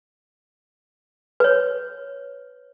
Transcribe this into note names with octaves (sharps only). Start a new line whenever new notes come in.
B4 C#5